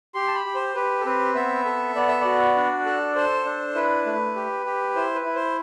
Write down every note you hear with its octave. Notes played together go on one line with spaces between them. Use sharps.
G4 C6
A5
B5
G4
C5
G4 B4
A4
C4 B4
B3 E5
A4
B3 D5
E5
F#4 D5
D4
A4
A4 C5
D4
E4 B4
A3
G4
G4
E4 C5
B4
E4
C5